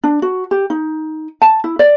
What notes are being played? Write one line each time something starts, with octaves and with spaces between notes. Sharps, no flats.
D4
F#4
G4
D#4
A5
E4
D5